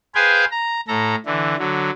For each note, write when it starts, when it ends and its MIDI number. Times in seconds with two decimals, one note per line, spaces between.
0.15 0.45 68
0.15 0.45 71
0.15 0.45 72
0.15 0.45 77
0.15 0.45 79
0.15 0.45 80
0.51 0.80 82
0.88 1.15 45
0.88 1.15 69
0.88 1.15 82
1.26 1.56 50
1.26 1.56 52
1.58 1.90 50
1.58 1.90 54